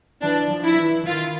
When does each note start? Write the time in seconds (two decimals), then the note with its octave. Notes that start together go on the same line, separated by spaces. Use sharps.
0.22 E3 D4
0.51 F3
0.64 E4
0.78 E3
1.07 D#3 F4